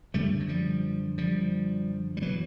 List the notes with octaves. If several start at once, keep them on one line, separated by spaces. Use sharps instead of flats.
F#2 D3 G3 A3
F#3
F3 G3
F3 G3
G3
B2 E3 F#3